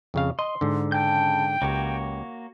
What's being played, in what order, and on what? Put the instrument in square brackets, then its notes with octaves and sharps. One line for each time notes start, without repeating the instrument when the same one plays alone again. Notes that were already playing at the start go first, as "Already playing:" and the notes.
[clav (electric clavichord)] F2 C#3 F5
[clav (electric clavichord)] D#5 [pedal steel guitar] C6
[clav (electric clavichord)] G#2 D3
[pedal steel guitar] C#3 A5 G6 [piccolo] G5
[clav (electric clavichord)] C#2 G4 [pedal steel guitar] A#3 F#4 C#5